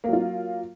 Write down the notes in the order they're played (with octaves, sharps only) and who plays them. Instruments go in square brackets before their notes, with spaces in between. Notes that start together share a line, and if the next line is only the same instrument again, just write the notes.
[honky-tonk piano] A#3
F#3
F4